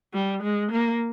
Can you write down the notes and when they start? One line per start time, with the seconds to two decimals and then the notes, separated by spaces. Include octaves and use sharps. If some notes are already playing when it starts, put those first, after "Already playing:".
0.14 G3
0.43 G#3
0.71 A#3